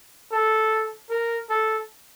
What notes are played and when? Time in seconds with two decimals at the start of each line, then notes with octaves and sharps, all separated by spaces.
0.32 A4
1.10 A#4
1.49 A4